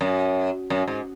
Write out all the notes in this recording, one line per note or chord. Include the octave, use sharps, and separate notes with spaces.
F#2
F#2
G#2